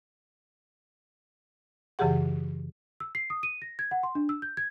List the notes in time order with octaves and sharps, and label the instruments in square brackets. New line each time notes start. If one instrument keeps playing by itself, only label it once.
[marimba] F#2 C#3 E3 G4 G#4 F#5
[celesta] E6
C7
D#6
D#7
A#6
G#6
F#5
C6
D4
E6
G6
G#6